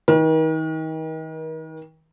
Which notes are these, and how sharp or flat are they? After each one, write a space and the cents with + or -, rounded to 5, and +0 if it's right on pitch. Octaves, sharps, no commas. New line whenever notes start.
D#3 +35 A#4 +45